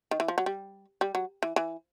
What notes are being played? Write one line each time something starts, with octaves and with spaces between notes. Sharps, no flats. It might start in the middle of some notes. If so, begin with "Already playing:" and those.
D#3
E3
F3
F#3
G3
G3
F#3
E3
E3